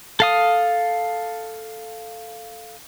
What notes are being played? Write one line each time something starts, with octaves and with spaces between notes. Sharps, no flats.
A4 F5 D#6